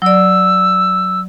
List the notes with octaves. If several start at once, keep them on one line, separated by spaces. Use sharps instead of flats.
F#3 D5 E6